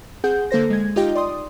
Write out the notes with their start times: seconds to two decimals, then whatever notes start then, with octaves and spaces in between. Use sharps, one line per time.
0.24 C4 G#4 F#5 G6
0.51 D3 A#3 A4 C5 A#6
0.70 G#3 G#6
0.96 D#4 F4 G4 D#5 G5
1.15 D5 C6 D#6